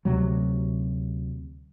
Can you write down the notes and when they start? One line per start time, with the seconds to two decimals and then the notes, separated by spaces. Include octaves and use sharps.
0.05 D2 C3 F#3